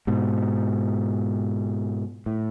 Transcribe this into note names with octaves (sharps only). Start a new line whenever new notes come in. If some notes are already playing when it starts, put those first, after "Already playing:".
G#2 B2
A2